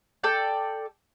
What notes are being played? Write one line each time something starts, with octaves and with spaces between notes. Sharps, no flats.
A4 D5 G5